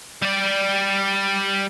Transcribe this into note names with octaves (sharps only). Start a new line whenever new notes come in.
G3 D5